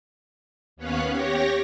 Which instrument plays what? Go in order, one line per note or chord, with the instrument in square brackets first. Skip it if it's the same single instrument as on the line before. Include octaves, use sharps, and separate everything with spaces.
[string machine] D#2 B3 C#4 C#5 F5 F#6
G4 C#5 A#6